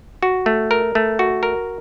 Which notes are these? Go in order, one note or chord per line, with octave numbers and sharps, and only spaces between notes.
F#4
A3
A#4
A3
F#4
A#4